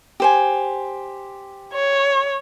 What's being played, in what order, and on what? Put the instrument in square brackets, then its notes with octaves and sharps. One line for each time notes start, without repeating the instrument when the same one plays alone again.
[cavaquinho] G4 C5 G#5
[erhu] C#5